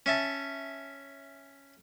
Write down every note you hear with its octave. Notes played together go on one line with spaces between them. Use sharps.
C#4 E5 A5